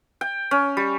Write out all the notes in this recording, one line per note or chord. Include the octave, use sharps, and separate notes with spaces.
G5
C#4
G3